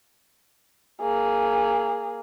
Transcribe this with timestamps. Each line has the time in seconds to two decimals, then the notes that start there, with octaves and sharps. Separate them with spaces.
1.01 A#3 G#4